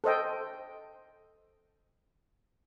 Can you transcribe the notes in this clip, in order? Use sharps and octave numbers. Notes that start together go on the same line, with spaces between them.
A4 C5 D#5 G5